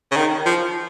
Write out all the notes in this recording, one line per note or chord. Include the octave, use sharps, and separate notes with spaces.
C#3
D#3
F3